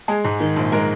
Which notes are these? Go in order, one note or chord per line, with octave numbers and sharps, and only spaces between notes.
G#3 G#4
G#2
D#3
A#1
G#3 A#4